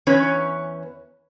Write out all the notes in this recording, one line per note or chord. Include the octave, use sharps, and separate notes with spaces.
E2 C#4 B4 C#5